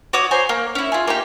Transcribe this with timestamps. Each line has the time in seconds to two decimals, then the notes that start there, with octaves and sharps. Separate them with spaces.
0.13 F#4 C#5 D6 D#6
0.31 C5 C#5 G#5 A#5
0.49 A#3
0.75 C#4 E4
0.92 F4 G#4
1.07 A#3 D#4 G4